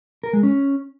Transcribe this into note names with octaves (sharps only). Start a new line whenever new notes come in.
A#4
G#3
C#4